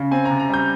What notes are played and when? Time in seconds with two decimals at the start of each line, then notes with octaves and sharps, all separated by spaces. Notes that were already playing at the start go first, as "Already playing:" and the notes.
Already playing: C#3
0.11 C4 G#5
0.25 A#5
0.30 C3
0.39 A#5
0.49 G3 G6